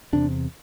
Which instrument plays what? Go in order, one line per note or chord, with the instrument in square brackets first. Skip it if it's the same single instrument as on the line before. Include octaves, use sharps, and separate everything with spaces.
[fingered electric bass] E2 C3 D4